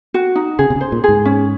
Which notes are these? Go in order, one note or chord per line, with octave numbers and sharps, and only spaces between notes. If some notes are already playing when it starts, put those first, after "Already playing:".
F#4
D#4
C#3 G#4
C3
C#3
C5
A#2
G#2 G#4
C#4